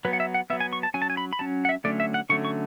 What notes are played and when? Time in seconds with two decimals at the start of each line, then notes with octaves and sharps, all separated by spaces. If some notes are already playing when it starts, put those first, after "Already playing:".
0.05 F#3 B4
0.08 B3
0.13 F#5
0.20 E5
0.34 F#5
0.50 F#3 B3 E5
0.60 G#5
0.73 C#6
0.83 A5
0.94 F#3 C#4 G#5
1.02 A5
1.10 G#5
1.17 B5
1.33 B5
1.39 F#3 C#4 A5
1.65 F#5
1.69 E5
1.84 D3 F#3 A3 C#4 D5
2.00 E5
2.14 F#5
2.30 D3 F#3 A3 C#4 C#6
2.45 C#6